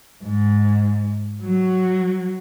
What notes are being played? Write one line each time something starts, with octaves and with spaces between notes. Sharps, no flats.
G#2
F#3